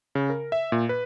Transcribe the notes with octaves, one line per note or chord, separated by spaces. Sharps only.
C#3
A#4
E5
A#2
B4